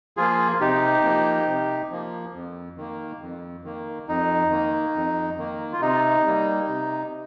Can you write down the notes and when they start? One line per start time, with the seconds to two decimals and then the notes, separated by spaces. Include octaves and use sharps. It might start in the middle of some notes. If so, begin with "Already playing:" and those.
0.17 F3 A#3 F4 G#4
0.61 C3 D#4 G4
1.04 F3 A#3
1.47 C3
1.91 F3 A#3
2.34 F2
2.77 D#3 A#3
3.22 F2
3.64 D#3 A#3
4.08 F2 D#4
4.51 D#3 A#3
4.95 F2
5.38 D#3 A#3
5.72 F4
5.81 C3 D#4
6.25 G3 A#3
6.69 C3